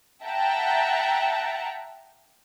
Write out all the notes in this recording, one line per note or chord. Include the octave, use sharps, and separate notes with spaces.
E5 F#5 G5 A5 A#5